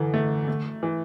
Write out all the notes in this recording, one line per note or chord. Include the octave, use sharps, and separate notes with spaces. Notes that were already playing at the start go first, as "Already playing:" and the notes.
Already playing: F#2 D3 E3
A3
A3
E3